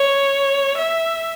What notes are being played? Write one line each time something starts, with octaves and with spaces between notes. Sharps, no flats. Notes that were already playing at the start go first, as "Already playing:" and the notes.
Already playing: C#5
E5